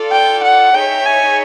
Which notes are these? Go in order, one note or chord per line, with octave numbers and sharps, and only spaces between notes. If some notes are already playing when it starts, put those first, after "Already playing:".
Already playing: F4 A4 D5
G5
F#5
D#4 G#4 C#5 E5 G5
G#5